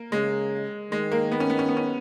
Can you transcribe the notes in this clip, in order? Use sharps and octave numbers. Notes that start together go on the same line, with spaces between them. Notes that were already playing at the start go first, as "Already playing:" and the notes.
Already playing: A#3
C#3 G#3
D#3 G#3
A#3
B3
C#4
B3
C#4
B3
C#4